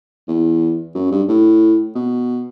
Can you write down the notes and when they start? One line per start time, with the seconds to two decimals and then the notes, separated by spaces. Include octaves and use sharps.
0.28 E2
0.95 F#2
1.11 G2
1.29 A2
1.95 B2